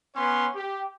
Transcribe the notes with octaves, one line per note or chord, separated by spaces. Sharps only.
B3 C#4 C#5 C6
G4